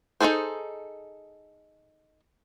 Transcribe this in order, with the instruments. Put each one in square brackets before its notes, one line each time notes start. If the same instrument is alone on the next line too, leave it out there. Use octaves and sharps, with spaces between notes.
[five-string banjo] D#4 F4 G#4 A4 C5